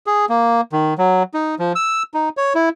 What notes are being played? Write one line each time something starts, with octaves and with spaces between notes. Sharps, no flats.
G#4
A#3
D#3
F#3
D#4
F3
E6
D#4
C#5
E4